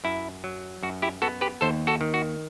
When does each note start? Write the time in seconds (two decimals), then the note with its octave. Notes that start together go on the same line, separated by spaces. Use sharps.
0.04 F#2 E4
0.44 F#3
0.83 F#2 F#4
1.02 E4 G4
1.22 B3 F#4 A4
1.41 G4 B4
1.61 D#2 A4 C5
1.87 F#4 A4
2.01 D#3
2.14 F#4